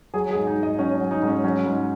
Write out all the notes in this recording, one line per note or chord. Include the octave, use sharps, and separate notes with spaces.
F#3 G#4
G#4
G#2
D#4
G#2
D#5
F#3 C#4
C#4
F#3
D#4
G#2
C#4
F#3 C#4
G#2